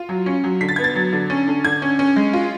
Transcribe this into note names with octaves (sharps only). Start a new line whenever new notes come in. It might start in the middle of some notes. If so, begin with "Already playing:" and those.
Already playing: F4
F#3
C#4
F#3
D3 B6
A6
B3 G#6
A6
F#3
D3
C#4
D3
D3 G#6
C#4
C#4
G#3
F4